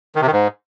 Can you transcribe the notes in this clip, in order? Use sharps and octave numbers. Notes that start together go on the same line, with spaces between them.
D#3
C3
D#3
G#2